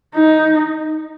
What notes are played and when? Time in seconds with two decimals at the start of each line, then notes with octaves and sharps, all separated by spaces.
0.15 D#4